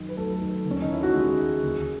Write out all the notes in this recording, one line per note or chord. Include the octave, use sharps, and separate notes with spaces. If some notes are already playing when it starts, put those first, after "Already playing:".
Already playing: F#2 D#3
B4
F#2 A3 A4
D#3
D#2
C#4
D#4
D#3 E4
F#4
D#2 G#3 G#4
D#3
D#2